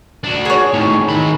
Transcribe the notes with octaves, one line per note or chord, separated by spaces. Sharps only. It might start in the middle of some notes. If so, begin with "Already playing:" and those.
D4 F#4
G#4 C#5
A2 D#3
D#3 B5